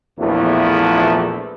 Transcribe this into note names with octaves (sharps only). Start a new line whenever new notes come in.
A#1 E2 E3 F3 A3 B3